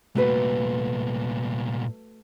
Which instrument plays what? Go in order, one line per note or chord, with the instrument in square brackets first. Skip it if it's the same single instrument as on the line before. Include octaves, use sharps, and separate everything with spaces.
[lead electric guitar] C2 A#2 [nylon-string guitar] A3 F#4 B4